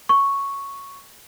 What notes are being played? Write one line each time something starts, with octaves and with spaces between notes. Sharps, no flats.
C#6